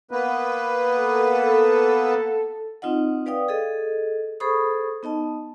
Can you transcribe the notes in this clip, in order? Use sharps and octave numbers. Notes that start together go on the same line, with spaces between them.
A#3 B3 B4
A4
C4 D#4 F4 D#5 F#5
B4 D5 F5 G5 D#6
G#4 A4 D#5
G#4 A4 C5 B5 C#6 D#6
B3 D#4 D#5 A5